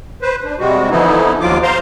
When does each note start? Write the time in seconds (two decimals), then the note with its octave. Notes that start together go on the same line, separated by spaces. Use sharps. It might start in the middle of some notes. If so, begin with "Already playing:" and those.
0.22 B4 C5
0.44 D4
0.59 C3 G3 G#3 F#4
0.91 D3 E3 F3 B3 D#4 E4
1.41 D#2 F3 F#3 F4 D6
1.63 C5 F5 A#5 C6